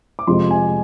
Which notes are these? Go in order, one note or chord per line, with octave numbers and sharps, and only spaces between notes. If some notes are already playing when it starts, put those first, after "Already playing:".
D6
F2 C3 F3 G#3 C6
G#5